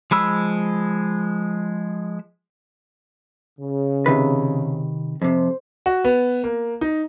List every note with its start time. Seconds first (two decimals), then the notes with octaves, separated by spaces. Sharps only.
0.11 F3 G#3 B5 E6
3.59 C#3
4.06 C3 D#3 B4
5.22 F2 C3 C5
5.86 F#4
6.05 B3
6.44 A#3
6.81 D#4